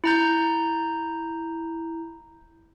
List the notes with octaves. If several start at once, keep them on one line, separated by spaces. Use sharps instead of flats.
E4 A#5 G6